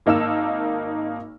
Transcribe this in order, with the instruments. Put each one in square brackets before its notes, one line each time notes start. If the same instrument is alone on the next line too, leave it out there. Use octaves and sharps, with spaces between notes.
[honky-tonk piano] G#1 A#3 D#4 A5 E6 E7